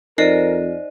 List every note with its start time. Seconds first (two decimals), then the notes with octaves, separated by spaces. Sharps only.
0.18 F2 D#4 A#4 C5 D5 D#5 C7